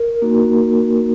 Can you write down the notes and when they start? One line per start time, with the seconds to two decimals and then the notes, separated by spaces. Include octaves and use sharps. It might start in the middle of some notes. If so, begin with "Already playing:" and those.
Already playing: A#4
0.22 A#3 D#4 F#4